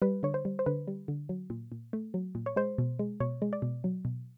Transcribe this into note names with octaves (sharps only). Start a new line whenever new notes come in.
G3 B4
D3 C#5
C5
G3
C5
D3 B4
G3
D3
F#3
A#2
A#2
A3
F#3
A#2
C#5
G#3 C5
B2
G#3
B2 C#5
G#3
D5
B2
F#3
B2